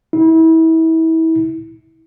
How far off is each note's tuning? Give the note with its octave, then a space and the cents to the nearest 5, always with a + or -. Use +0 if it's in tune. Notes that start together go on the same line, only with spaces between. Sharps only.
E4 -30